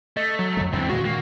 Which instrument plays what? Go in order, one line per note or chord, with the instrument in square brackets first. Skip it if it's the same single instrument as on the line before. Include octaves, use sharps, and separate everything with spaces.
[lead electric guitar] A3 [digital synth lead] D#5
[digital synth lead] F#3
[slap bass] F2 D3 G#3
[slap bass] E2 [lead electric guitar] D3 E3 [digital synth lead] C4
[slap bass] G2 A#2 D#3 [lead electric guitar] G#3 [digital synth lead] F#4
[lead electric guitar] A#3